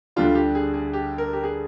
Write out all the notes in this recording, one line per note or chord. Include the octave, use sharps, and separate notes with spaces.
D2 D3 G3 D4 F4
G4
G#4
G#4
G4
A#4
G4
G#4